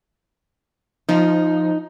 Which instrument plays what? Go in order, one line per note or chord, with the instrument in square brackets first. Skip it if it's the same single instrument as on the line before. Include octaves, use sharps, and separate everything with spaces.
[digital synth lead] F3 [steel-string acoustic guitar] D#4